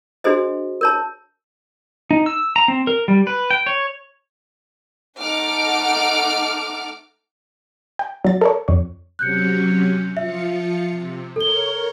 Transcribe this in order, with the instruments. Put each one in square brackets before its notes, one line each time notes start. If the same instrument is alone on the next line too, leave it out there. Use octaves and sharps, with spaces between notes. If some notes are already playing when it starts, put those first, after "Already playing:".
[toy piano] D4 F#4 G#4 C5 D#5
A#4 C#5 A5
[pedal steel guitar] D#4
E6
A#5
C4
A#4
G3
B4
G5
C#5
[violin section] A3 D#4 A4 F#5 D6 F6
[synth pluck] G5
F#3 A6
A4 A#4 C#5
F2 C#5
[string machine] C3 F#3 C#4 [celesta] F#6 G6 C#7
[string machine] F3 F4 C#7 [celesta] E5
[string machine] C3
[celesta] A4 G7 [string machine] A#4 C#5